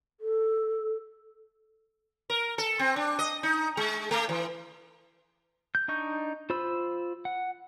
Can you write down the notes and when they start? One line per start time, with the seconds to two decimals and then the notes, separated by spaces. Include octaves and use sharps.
0.20 A4
2.30 A#4
2.58 A4
2.79 C4
2.96 D4
3.19 D#5
3.43 D#4
3.77 G#3
4.11 A3
4.29 E3
5.75 G6
5.88 D4 D#4 D#5 C#6 G6
6.50 F4 C5 B5 E6
7.25 F#5